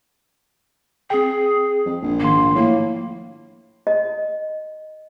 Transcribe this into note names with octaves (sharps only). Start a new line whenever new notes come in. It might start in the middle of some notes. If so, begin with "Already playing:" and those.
C4 G#4 G5
F2
A#1
G#2 D#3 A#3 C6
A2 F3 A#3
D#5